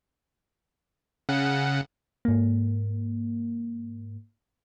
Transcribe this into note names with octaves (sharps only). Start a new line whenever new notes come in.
C#3 F#5
G#2 A#3